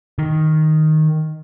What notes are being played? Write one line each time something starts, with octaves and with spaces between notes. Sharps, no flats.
D#3